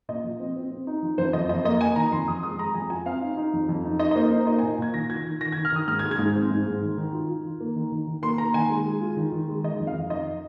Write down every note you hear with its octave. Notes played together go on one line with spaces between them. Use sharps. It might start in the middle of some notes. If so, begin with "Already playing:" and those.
A#2 D#5
F3
C4
C4
C4
D#4
F3
F2 C5
F2 D#5
F2 D#5
A#3 D#5
A#3 G#5
D#3 A#5
F2 C6
F2 D#6
G#3 D#6
G#3 A#5
F2 G#5
F4 G#5
C4 F5
D#4
D#4
F2
F2
D#4
D#4 D#5
D#5
A#3 C5
D#4 C5
A#3 D#5
G#5
A#2
A#2 G#6
D#3 A#6
F4 G#6
D#3
D#3 A#6
G#6
D#3
F6
D#3 D#6
G#2 F6
G#6
G#3
G#6
G#2
C4
G#2
G#2
D#3
D#3
F4
F4
D#3
A#3
D#3
D#3
D#3
A#3 C6
A#3 A#5
D#3 G#5
G#3
G#3
F4
D#3
D#3
G#3
D#3 D#5
F2
F5
D#3
F2 D#5